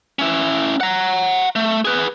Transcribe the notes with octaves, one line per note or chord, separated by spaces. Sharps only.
C#4 E4
F#5 A#5
A3
G#4 B4